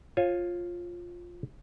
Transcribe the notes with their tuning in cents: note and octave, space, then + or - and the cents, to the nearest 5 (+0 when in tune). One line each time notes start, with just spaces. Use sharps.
F4 +5 C#5 -35 G#5 +0